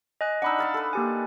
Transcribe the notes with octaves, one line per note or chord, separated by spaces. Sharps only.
D#5 G#5 F#6
D4 D#4 F#5 B5 E6
F5 A5 C6
A4 B4
A#3 G4 G#5